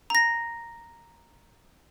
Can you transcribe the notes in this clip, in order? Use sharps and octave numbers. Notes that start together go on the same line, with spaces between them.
A#5 A#6